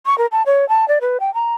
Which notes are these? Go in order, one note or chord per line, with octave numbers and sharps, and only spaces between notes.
C#6
A#4
A5
C#5
A5
D5
B4
G5
A#5